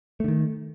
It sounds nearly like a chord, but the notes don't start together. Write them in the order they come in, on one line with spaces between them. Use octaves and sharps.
A3 D3 D#3